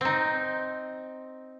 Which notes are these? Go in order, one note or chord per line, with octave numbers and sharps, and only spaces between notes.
C4 D#4